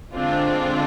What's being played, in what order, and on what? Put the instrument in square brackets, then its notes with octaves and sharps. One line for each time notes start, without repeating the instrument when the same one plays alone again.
[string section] D3 G#3 C4 D4 F4